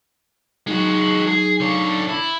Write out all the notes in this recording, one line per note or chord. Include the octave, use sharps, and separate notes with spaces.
F#3 G#3 D#4 F#4
G#4
D3 C#5
E4